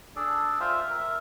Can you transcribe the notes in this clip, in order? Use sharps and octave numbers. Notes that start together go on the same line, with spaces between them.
D4 G#4 A4 D5
F4 C5 E5 F5 G5
A#4 E5